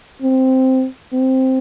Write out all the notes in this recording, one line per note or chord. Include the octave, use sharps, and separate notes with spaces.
C4
C4